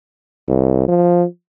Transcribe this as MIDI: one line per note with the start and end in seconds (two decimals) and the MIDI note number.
0.48 0.87 36
0.88 1.24 53